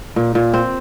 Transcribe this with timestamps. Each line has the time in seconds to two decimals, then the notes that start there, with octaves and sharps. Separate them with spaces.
0.16 A#2
0.35 A#2
0.54 C4